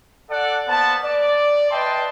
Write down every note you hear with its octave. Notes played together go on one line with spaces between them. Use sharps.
A4 D5 F#5
A#3 B3 C5 A5
D5
B4 D#5 E5 G5 A5 C6